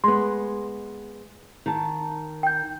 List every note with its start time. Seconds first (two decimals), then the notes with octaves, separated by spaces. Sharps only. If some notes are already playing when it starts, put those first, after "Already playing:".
0.04 G#3 B3 C6
1.66 D#3 A5
2.43 G5 G6